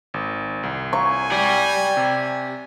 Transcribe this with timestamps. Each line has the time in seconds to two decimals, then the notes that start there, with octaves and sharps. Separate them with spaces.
0.14 G#1
0.63 C2
0.93 G#5 C#6
1.31 G4 D5
1.97 C3